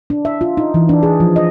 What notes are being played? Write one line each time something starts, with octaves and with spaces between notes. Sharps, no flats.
D4
E5
F4
D#4
E3
D4
G#4
F3
D#5